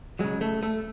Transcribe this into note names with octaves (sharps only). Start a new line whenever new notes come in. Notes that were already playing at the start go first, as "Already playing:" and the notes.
C#3 F#3 G#3
A3
A3